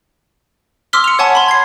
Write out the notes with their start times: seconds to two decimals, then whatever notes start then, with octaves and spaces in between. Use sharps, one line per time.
0.93 C6 D6 E6 F6 B6 G7
1.04 C#7 F7
1.19 C#5 F#5 G#5 A5 C#6
1.35 B5 C6
1.48 G#6 C7